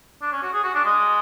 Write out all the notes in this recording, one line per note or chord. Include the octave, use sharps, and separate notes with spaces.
D4
C#4
F#4
G#4
F#4
D4
G#3